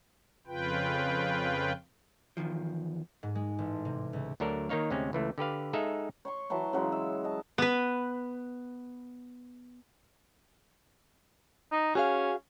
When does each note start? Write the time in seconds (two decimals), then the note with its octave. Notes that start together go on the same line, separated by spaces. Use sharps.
0.47 F2 C#3 F4 B4 G5
2.37 E2 B2 D#3 F3
3.23 G#2
3.35 G#3
3.58 A1
3.85 C3
4.13 C#2
4.40 D2 F#3 D4 A4 A#4 D5
4.69 D#3 A#3 D#4 C#5 F5
4.90 D2 C3 G#3 C4 C#4
5.13 C#2 E3 A3
5.38 D3 G4 B4 F5
5.73 G#3 D#4 G#4 A4 E5 F5
6.25 C#5 C6 C#6
6.50 E3 F#3 A5 C6
6.73 C#3 F#3 G#3 F4
6.92 E5
7.24 D#5 A5
7.58 B3 B4
11.72 D#4
11.95 C#4 F#4 G#4 F5